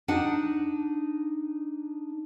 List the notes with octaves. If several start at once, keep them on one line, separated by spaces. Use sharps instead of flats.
D4 D#4 F#5